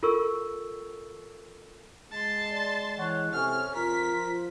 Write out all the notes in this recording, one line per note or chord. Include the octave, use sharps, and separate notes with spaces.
F4 A4 A#4 C#6 E6
G#3 A5 C6
D5
E3 C#5 F#5
C3 C#4 A4 F6
F2 F4 A#4 B6
F3